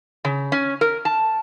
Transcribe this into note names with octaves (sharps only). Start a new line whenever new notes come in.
C#3
C#4
A#4
A5